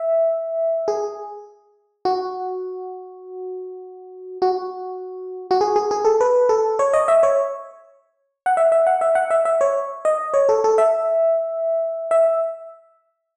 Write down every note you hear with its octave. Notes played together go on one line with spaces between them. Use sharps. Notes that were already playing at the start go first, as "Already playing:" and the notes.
Already playing: E5
G#4
F#4
F#4
F#4
G#4
G#4
G#4
A4
B4
A4
C#5
D#5
E5
C#5
F#5
E5
E5
F#5
E5
F#5
E5
E5
C#5
D#5
C#5
A4
A4
E5
E5